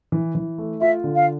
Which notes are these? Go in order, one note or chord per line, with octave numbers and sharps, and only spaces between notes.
E3
E3
A3
F4 E5
D3
F5